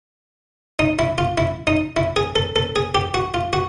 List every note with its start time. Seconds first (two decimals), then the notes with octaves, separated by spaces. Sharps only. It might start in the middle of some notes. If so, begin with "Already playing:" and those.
0.79 D#4
0.99 E4
1.18 F4
1.38 E4
1.67 D#4
1.97 E4
2.16 G#4
2.36 A4
2.56 A4
2.76 G#4
2.95 G4
3.14 F#4
3.34 F4
3.53 F#4